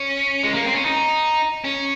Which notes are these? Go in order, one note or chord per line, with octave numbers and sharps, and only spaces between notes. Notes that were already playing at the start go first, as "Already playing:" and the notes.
Already playing: C#4
G#3
A#3
C4
C#4
D#4
C#4